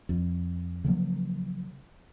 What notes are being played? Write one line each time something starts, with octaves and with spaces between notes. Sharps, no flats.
F2
C#3 F3 F#3 A#3